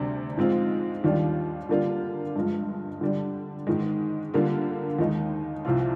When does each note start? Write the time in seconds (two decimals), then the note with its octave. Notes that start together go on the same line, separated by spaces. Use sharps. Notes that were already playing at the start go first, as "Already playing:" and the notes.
Already playing: D2 C3 G3 D4
0.37 G#2 F3 G#3 C4 F4
1.04 D#2 D#3 G3 D4 F4
1.69 D3 G3 A#3 D4 F4
2.36 G2 F3 G#3
3.01 D3 G3 D4
3.67 G#2 D#3 G#3
4.34 D3 G3 A#3 F4
4.99 D#2 D#3 G#3 D#4
5.65 C2 C3 F3 C4 F4